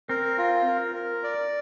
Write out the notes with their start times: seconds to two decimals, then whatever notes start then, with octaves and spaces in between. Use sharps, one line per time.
0.09 C4 A#4
0.38 F4
0.67 A#4
0.95 A#4
1.24 D5